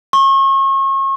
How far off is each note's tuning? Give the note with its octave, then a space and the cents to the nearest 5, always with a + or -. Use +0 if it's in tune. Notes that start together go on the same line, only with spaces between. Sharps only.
C#6 -35